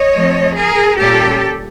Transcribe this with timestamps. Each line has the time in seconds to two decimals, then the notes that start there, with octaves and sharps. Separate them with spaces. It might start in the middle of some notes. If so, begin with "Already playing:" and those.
Already playing: C#5 D#5
0.14 F3 A3 C4
0.57 G#4 A#4
0.99 A#2 G3 A#3 C#4 G4 A4